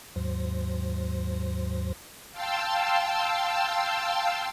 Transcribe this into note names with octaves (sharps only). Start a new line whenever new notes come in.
D#2 G#2 F#3 C5 A#6
F5 G5 A5 C6 E6